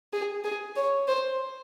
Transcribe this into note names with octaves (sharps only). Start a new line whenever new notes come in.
G#4
G#4
C#5
C5